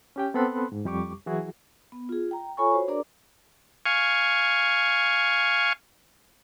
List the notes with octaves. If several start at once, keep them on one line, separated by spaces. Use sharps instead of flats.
C#4 G4 G5
B3 C4 A4 B5 C6 F#6
G#2
F2 G3 G4 C#6 D6
E3 F#3 E4 F#4 G#4
B3
F4 G#4
G5 A#5
F4 A4 C#5 G#5 B5 C#6
F#4 C5 C#5
D4 G#4 A#4 D5 A#5 D6
F5 G#5 C#6